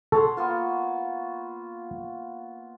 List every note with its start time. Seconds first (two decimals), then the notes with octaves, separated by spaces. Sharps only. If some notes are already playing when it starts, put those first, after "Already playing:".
0.12 A4 C#5 F#5 C6
0.37 A#3 B3 F4